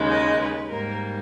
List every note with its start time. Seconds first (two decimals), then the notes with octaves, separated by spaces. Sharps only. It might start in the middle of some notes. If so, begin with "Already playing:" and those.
Already playing: D#2 C#3 G#3
0.11 D#5
0.40 B4
0.70 G#2 G3 A#3 A#4